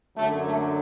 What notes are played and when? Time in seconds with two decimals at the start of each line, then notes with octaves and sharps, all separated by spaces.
0.17 F#2 D3 F#3 A3
0.46 A3